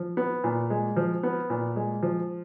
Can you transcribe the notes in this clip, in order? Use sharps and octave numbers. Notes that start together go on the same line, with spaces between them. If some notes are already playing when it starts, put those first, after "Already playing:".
Already playing: F3
B3
A#2
G#3
F3
B3
A#2
G#3
F3